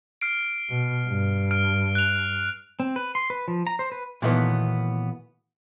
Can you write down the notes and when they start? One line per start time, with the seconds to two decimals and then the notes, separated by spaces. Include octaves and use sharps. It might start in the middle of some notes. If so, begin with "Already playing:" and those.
0.21 F6 C7 D7
0.70 B2
1.07 G2
1.51 F6 D7
1.95 F#6 F7
2.80 C4
2.96 B4
3.15 C6
3.30 B4
3.48 F3
3.67 A#5
3.79 C5
3.92 B4
4.22 A#2 D#3 E3 F#3 A3 B3